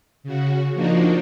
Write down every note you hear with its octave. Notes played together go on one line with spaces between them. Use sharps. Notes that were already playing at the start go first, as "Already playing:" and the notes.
C#3 F#4
F3 A#3 D4 D#4 F#4